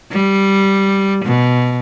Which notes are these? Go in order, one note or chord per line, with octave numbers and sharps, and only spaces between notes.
G3
B2